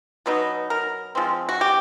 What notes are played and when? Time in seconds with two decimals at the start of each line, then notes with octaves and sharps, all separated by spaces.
0.26 B2 F#3 B3 D#4
0.70 A#4
1.15 F3 G#3 C4
1.49 F#4
1.61 G4